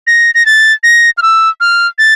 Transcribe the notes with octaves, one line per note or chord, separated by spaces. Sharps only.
A#6
A#6
A6
A#6
F6
E6
F6
A6